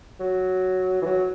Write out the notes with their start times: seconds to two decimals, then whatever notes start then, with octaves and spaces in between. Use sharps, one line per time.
0.20 F#3
1.01 E3
1.06 F#3